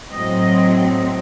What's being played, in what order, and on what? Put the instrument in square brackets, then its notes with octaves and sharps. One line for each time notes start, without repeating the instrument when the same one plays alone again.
[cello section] A2 F#3 C4 D#5